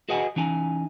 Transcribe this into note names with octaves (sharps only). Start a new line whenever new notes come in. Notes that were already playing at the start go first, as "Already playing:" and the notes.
F#4 G#4 B4 D#5 F#5 G#5
E3 C#4 D#4 G#5